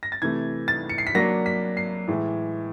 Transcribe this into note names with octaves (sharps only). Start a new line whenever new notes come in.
A#6
A6
C3 E3 A3 G#6
A6
C#7
C7
B6
F#3 A#3 D4 A#6
B6
C7
A2 E3 G#3